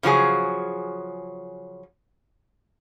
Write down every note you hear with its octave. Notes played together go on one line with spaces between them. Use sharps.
C#3 F3 F#3 G#4